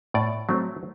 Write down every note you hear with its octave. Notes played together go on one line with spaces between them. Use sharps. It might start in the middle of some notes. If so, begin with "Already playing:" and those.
A2 D5
F#3 A3 C4